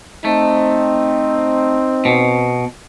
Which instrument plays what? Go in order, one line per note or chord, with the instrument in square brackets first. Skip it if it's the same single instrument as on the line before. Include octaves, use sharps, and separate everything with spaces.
[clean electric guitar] A3 [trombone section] C4 [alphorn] D#4
[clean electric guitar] B2